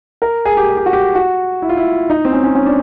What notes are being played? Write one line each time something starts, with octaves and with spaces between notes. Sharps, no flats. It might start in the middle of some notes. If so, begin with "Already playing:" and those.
A#4
G#4
G4
G#4
G4
F#4
G4
F#4
E4
F4
E4
D#4
C4
C#4
C#4
C#4
D4